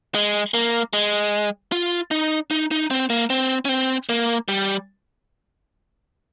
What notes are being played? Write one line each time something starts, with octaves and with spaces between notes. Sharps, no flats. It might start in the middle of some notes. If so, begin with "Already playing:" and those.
G#3
A#3
G#3
F4
D#4
D#4
D#4
C4
A#3
C4
C#4
C4
A#3
G3